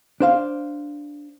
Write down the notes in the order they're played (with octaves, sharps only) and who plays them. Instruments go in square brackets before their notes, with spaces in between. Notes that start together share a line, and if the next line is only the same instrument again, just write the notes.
[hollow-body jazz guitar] D4 C5 F5